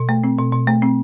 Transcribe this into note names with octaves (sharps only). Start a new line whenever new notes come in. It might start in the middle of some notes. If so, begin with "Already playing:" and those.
Already playing: B2
A3
C4
B2
B2
A3
C4